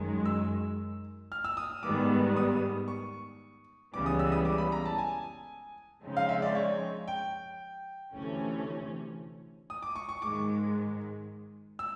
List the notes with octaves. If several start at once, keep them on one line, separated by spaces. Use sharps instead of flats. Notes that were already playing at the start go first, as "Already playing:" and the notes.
Already playing: F#2 D#3 G#3
E6
F6
E6
D#6
G#2 D#3 G3 B3 D6
D#6
C#6
C#2 C#3 E3 G3 B3 D6
D#6
E6
D#6
D6
B5
A#5
A5
G#5
C#3 F3 G#3 C4 D#4
F5
E5
D5
C#5
G5
D2 C3 E3 A3 C#4
D#6
D6
C#6
C#6
G#2 D#3 G#3 D6
E6